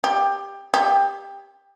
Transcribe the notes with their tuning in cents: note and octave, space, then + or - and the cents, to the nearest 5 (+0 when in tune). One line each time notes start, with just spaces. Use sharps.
G4 +15
G4 +15